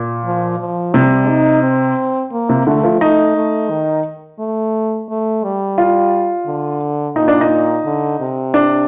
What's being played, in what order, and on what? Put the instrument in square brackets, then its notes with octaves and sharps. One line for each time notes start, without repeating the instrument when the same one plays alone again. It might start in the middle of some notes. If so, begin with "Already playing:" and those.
Already playing: [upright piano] A#2
[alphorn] F3
F3
[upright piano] C3 [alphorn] G3
[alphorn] D#4
C4
A#3
[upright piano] C3
[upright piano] D3 [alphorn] A3
[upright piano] F3
[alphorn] A3 [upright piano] D#4
[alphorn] A3
D#3
A3
A3
G3
[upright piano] F4
[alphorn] D3
[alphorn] A#2 [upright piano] D#4
[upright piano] D4
D#4
[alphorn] D3
C3
[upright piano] D4